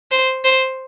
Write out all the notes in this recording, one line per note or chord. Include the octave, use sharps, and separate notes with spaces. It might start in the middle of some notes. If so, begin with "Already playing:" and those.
C5
C5